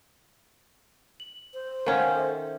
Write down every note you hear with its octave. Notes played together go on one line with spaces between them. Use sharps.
F#7
C5
D#3 C#4 F5 F#5 G#5
A4 E5